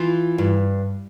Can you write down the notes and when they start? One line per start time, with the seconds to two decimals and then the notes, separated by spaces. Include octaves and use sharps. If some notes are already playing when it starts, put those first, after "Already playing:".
Already playing: E3 F4
0.38 G2